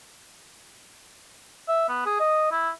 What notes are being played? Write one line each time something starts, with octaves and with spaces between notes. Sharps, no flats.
E5
B3
G#4
D#5
E4